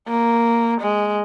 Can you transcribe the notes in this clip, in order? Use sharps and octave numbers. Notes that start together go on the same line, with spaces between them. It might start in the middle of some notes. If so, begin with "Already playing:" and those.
A#3
G#3